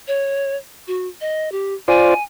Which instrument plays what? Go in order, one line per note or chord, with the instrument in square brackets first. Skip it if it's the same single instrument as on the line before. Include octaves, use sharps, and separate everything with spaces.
[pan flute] C#5
F#4
D#5
G4
[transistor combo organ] F4 C5 D5 [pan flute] G#5